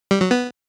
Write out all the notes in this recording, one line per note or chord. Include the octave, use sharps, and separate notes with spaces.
G3
F#3
B3